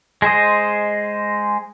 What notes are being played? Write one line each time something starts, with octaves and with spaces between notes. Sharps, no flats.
G#3 G#4 C5 D#5